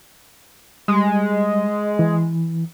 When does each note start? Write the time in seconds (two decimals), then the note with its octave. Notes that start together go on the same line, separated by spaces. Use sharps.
0.88 G3 G#3
1.99 E3